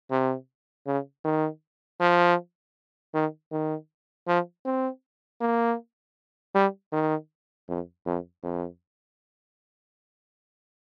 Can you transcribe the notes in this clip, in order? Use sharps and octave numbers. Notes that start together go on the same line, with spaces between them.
C3
C#3
D#3
F3
D#3
D#3
F3
C4
A#3
G3
D#3
F2
F2
F2